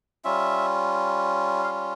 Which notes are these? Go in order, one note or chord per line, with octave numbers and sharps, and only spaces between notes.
G3 C#4 F4 E5
F5